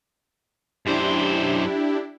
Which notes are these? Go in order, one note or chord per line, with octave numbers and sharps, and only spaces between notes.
F#2 D4 E4 G4 C5